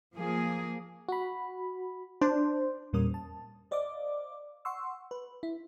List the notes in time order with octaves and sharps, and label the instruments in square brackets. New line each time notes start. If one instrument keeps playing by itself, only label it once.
[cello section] F3 A#3 G#4
[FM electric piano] F#4 B5
[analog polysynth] D4 [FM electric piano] C5
[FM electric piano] E2 A#2 G3 C#4 A#4 D#6
A5
C5 D5 D#5 F5 D6
F#5 C6 C#6 E6
B4
E4